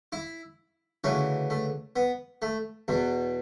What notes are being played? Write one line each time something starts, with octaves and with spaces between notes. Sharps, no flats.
E4
D2 C#3 E3 C#4
A3
B3
A3
E2 B2